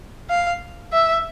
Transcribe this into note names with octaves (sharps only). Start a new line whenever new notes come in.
F5
E5